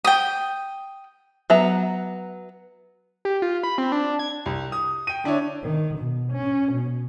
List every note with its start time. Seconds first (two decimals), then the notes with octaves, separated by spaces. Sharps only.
0.05 G5 D#6
1.50 F#3 B3 E5 A#5
3.25 G4
3.42 F4
3.63 B5
3.78 C4
3.92 D4
4.19 G#6
4.46 C2
4.72 D#6
5.07 G5 D#7
5.24 D3 D4 E4 C#5
5.64 D#3
5.98 B2
6.33 C#4
6.73 B2